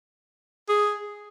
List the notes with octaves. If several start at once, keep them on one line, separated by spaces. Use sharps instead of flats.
G#4